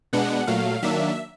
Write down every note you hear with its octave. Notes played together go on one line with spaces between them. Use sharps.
B2 G#3 B3 D4 F#5
A#2 F#3 A3 F5
D#3 F#3 A#3 D4 E5